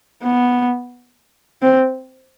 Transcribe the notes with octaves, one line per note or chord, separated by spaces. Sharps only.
B3
C4